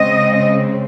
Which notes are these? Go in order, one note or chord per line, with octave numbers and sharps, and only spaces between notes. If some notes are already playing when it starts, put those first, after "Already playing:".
Already playing: C#3 G#3 C4 D#5